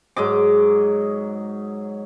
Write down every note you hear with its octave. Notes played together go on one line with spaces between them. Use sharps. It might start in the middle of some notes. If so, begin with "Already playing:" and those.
G#2 F#3 D#5 D6